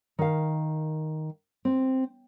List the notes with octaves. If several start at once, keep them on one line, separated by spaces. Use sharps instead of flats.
D#3 F5
C4